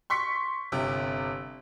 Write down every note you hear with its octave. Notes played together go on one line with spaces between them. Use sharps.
C6 C#6 B6 C#7
G1 C3